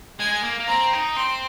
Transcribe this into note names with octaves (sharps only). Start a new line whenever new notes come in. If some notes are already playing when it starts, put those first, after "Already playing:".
G#3 G#5
A#3
A#3
C4 A#5
D#4
C4 C6